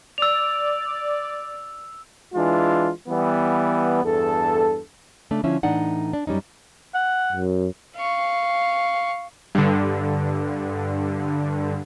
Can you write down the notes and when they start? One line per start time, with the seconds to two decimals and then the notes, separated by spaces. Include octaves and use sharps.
0.18 D5 E6 F7
2.34 E3 G#3 D4 F4
3.08 E3 G3 B3
4.03 E2 G2 A4
5.31 C#3 A3 D4
5.44 D3 F3 C#4 E4 E5
5.63 A2 E3 D4 D#4 F#5
6.13 D4
6.27 F#2 G3 C#4 D#4
6.95 F#5
7.33 F#2
7.96 F5 C#6
9.55 G2 D3